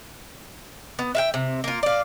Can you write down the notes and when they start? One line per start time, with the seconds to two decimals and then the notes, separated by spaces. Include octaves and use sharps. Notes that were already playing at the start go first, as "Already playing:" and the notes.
0.99 B3
1.15 E5 F5 G5
1.34 C3
1.64 A#3 F4
1.83 D5 F5